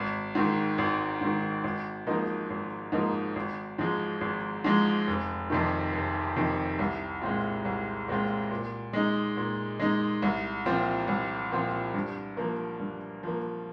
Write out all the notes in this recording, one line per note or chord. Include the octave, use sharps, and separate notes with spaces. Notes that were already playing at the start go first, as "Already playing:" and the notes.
Already playing: G#1
G#2 D#3
G#1
G#2 D#3
G#1
G#2 F3 A#3 D#4
G#1
G#2 F3 A#3 D#4
G#1
G#2 F3 G#3
G#1
G#2 F3 G#3
F1
F2 C3 D#3
F1
F2 C3 D#3
C2
A#2 G#3 C4 F4
C2
A#2 G#3 C4 F4
A#2
G#3 D#4
A#2
G#3 D#4
C2
A#2 F3 C4 F4
C2
A#2 F3 C4 F4
G2
F3 A#3
G2
F3 A#3